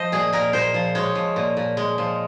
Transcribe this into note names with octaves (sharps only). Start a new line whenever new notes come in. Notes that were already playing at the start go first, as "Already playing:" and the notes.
Already playing: F3 C5 D#5
A#2 G#4
A#2 A#4
A#2 C5
F3
G#3 C#5
F3
A#2
A#2
G#3
F3